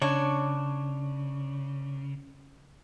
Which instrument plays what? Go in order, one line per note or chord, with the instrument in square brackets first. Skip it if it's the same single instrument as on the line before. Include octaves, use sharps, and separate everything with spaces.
[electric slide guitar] C#3 [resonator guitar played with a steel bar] D4 C#5